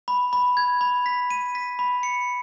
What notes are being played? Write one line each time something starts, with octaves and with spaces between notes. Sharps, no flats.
B5
B5
G#6
B5
B6
D#7
B6
B5
C#7